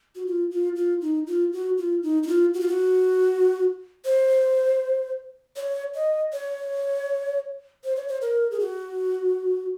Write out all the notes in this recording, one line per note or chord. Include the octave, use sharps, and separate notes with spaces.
F#4
F4
F4
F4
D#4
F4
F#4
F4
D#4
D#4
F4
F#4
F4
F#4
C5
C#5
D#5
C#5
C5
C#5
C5
A#4
G#4
F#4